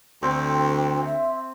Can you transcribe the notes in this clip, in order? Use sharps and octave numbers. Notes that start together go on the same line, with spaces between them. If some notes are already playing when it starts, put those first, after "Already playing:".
D2 C4 G5
E5